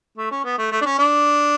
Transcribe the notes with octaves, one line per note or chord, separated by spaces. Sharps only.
A3
C#4
B3
A3
A3
D4
C#4
D4